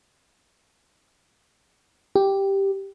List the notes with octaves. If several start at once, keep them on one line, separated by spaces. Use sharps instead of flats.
G4